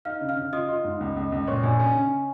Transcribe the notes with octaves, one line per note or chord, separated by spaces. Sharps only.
D#4 F5 F6
C#3
F5 F6
C#3
F4 D#5 D#6
F4
G#2
C#2
C#2
C#2
A#2 C#5 C#6
A#1 G#5
C#4 G#5
C#3